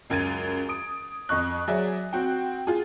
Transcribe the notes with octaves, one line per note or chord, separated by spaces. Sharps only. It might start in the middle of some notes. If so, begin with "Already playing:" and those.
C#2 F#2 G#6 A6 D#7
D#6 D7
F2 D#5 C#6 F#6
F#3 G#4 D5 E5
C4 F#4 G5
F4 G#4